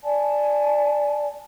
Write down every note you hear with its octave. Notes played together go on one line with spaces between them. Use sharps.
D5 G#5 A5